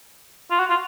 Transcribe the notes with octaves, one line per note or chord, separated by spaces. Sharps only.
F4
F#4
F4